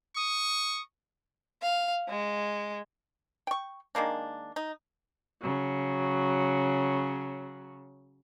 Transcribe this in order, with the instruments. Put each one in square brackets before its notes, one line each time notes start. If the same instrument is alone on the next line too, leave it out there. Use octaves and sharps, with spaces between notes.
[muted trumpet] C#6 [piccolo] D#6
[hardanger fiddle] F5
G#3
[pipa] G5 C#6
D#3 G#3 A#3 D4
D#4
[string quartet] C#3 F#3